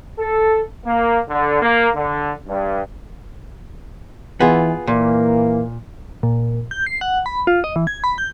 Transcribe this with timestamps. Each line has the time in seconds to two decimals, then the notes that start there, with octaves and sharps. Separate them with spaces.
0.19 A4
0.86 A#3
1.29 D3
1.62 A#3
1.94 D3
2.48 G2
4.40 E3 B3 F4 G#4
4.87 A#2 E3 A#3
6.23 A#2
6.71 G6
6.86 C7
7.01 F#5
7.26 B5
7.47 F4
7.64 D#5
7.76 E3
7.87 G#6
8.04 B5
8.18 G6